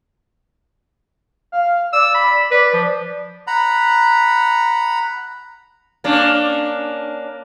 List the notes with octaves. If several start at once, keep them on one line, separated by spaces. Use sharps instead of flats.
F5
D5 E6
B5
B4 D5
F3
F#5 A#5 B5
A#3 C#4 D4